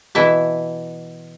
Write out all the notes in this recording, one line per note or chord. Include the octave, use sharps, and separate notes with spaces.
B2 E3 E4 E5 A5